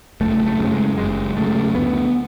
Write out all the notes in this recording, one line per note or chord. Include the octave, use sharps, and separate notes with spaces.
F#1 A3
A3
F#2 C#3
G#3
F#1 G#3
F#2 C#3 A3
D2 B3